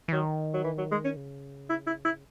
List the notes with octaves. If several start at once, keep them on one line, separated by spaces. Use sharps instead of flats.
E3
D#3 F#3
F#3
E3
F#3
G#3
C#4
C#3
E4
E4
E4